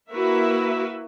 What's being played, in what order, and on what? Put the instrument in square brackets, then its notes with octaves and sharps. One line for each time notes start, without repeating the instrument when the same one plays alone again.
[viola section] A#3 E4 F#4 A#4 B4 E5